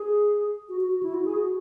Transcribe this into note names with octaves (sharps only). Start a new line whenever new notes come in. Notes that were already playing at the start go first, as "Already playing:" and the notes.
Already playing: G#4
F#4
F#4
F#4
E4
F#4
G#4
F#4